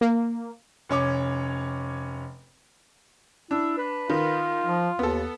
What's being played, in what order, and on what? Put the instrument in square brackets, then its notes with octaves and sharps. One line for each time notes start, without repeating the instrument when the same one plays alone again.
[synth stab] A#3
[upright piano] F1 C#4 C#5 D6
[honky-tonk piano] D4 [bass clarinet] E4
[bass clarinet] B4
[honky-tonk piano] D#3 [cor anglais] F4
[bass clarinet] F3
[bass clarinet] D#2 [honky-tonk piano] B3 A4